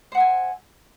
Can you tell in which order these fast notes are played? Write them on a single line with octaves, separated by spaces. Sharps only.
C5 F#5 E5 G#5